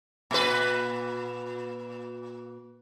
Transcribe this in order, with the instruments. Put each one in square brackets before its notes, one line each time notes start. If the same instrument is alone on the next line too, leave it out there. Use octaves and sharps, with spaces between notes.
[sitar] A#2 B4